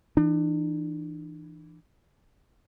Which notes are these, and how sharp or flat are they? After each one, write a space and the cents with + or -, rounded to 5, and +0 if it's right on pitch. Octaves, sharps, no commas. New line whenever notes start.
E3 +0 D4 +40